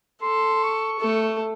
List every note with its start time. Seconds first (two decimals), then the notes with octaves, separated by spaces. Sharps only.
0.22 A4 C6
0.63 C#6
0.99 A3 A4